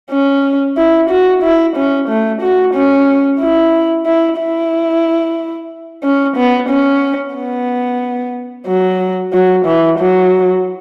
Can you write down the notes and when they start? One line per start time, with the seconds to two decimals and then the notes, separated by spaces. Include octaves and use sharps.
0.11 C#4
0.77 E4
1.10 F#4
1.42 E4
1.76 C#4
2.09 A3
2.42 F#4
2.75 C#4
3.40 E4
4.06 E4
4.39 E4
6.03 C#4
6.37 B3
6.69 C#4
7.35 B3
8.67 F#3
9.33 F#3
9.66 E3
9.99 F#3